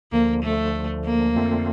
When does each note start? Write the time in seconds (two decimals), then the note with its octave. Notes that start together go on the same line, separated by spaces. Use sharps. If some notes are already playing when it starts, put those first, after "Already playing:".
0.12 D2 D3 F3 A#3
0.43 A3
1.05 A#3
1.36 F2 D3 A3 C4 F4